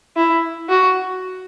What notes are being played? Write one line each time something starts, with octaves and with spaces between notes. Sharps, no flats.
E4
F#4